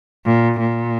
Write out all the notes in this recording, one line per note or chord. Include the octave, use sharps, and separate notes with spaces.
A#2
A#2